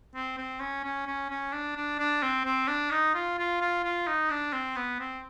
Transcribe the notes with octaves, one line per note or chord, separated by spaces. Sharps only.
C4
C4
C#4
C#4
C#4
C#4
D4
D4
D4
C4
C4
D4
D#4
F4
F4
F4
F4
D#4
D4
C4
B3
C4